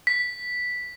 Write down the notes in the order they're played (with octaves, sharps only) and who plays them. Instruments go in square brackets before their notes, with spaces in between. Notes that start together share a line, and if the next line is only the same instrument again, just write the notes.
[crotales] B6